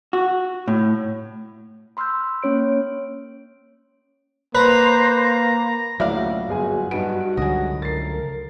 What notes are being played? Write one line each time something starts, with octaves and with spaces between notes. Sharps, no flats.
F#4
A2
B5 C6 E6 F6 G6
A#3 C#4 C#5 D7
A#3 B4 C5 A#5
D2 A#2 C#3 F#3 E4 D5 F5
G1 A#2 C#3 F#4 G#4 G#5
G2 B3 D#4 F#4 D7
C#2 D3 F#3 G#4 D#5
F3 A3 A#4 A6 C7